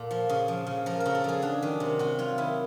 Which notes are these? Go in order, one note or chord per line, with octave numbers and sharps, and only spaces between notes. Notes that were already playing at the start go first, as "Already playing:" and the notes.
Already playing: A#2 A4
F3
C#3
F3
C#3
F3 A#4
A#4
C#3
A4
F3 G#4
F#3 D4
D#3
C3
C3 F#4
F#3 F4
D#3 E4